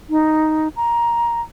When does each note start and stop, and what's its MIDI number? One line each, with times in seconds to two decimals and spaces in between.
0.10 0.68 63
0.76 1.40 82